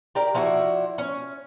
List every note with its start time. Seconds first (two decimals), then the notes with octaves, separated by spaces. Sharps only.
0.15 G4 A#4 D5
0.34 F3 D4 E4 F#4
0.98 C#4